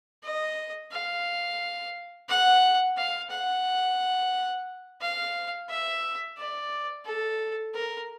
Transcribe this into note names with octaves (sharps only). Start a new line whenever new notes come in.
D#5
F5
F#5
F5
F#5
F5
E5
D5
A4
A#4